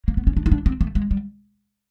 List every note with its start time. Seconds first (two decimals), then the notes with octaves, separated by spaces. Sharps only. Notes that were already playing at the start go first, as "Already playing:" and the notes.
0.08 A#3
0.17 B3
0.27 C#4
0.37 D4
0.46 D#4
0.52 D4
0.66 C4
0.81 A3
0.95 G#3
1.11 G3